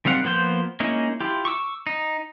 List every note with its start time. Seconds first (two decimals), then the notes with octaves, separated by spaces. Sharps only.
0.05 D#3 G3 C4 F5 F#5
0.24 F3 A#3 B3 C5 G6
0.80 G#3 A#3 C#4 D#4 E4
1.20 E4 F4 G4
1.45 C#6 D6 E6
1.87 D#4